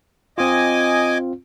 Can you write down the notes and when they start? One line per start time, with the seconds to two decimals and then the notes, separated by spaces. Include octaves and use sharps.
0.38 C4 F4 D#5 G#5 D6